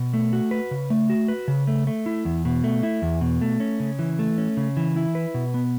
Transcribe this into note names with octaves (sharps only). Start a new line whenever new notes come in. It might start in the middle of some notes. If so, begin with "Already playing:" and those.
Already playing: B2
A3
F#4
B4
C#3
A3
F#4
B4
C#3
A3
A3
E4
E2
B2
A3
E4
E2
B2
A3
C#4
C#3
E3
A3
C#4
C#3
E3
E4
B4
B2
B3